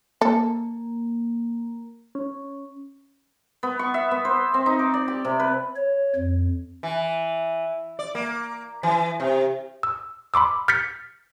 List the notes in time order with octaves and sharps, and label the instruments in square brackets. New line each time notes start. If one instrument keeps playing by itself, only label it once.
[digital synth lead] A#3 [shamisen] A4
[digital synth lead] C#4
[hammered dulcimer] B3
C#6
E5
B3
C5
C4
D#4
D6
D5
G4
C3
B4
[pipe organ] C#5
F2
[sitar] E3
D5
A#3
E3
C3
[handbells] E6
B5 C6 D6 E6
F6 G6 A6 B6 C#7